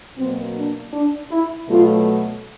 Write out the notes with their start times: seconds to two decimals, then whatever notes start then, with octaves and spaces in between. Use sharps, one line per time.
0.18 B2 F#3 A#3 C4
0.56 D4
0.93 D4
1.31 E4
1.69 B2 F#3 A3 F4